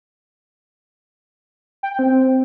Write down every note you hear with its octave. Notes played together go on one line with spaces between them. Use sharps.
G5
C4